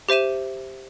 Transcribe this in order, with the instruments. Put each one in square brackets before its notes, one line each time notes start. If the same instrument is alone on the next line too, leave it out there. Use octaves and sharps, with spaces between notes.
[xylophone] G4 C5 E5 D#7 E7